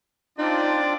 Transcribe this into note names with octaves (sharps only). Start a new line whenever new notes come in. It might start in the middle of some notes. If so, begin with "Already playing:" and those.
C4 D4 D#4 F4 D5